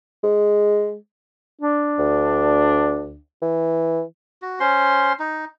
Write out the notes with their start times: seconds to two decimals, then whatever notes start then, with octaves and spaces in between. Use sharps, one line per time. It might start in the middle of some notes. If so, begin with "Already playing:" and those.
0.24 G#3
1.61 D4
1.99 D2
3.42 E3
4.42 F#4
4.60 C#4 C5 C6
5.19 D#4